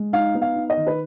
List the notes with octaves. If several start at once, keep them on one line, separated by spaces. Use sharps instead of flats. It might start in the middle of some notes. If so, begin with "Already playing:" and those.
Already playing: G#3
D#4 F5
B3
F5
D#4
D#5
D#3
B4